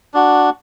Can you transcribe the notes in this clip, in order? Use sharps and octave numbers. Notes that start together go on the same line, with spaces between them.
D4 F#4